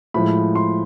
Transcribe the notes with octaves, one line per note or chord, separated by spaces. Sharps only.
A2 F3 G#3 B5
C6